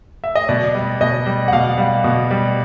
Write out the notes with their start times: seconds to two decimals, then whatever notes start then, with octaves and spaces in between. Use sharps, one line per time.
0.24 E5
0.35 D#5
0.49 B2 D5
0.75 G3
1.01 B2 D#5
1.26 G3
1.48 F#5
1.52 B2 F5
1.78 G3
2.04 B2
2.31 G3